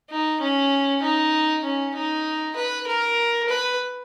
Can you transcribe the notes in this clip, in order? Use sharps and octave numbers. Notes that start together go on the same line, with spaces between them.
D#4
C#4
D#4
C#4
D#4
B4
A#4
B4